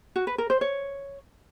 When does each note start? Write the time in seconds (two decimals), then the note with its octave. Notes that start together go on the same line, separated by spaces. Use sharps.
0.16 F#4
0.27 B4
0.38 A#4
0.50 C5
0.61 C#5